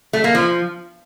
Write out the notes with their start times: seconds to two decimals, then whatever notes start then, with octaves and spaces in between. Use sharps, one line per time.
0.13 A3
0.24 A#3
0.35 F3